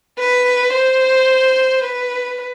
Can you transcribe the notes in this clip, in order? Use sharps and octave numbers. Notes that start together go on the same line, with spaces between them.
B4
C5
B4